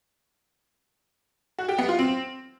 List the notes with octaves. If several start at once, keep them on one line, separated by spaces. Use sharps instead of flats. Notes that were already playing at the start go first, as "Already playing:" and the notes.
F#4
G4
B3
F4
C4